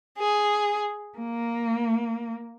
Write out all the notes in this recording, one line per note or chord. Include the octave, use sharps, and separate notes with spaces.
G#4
A#3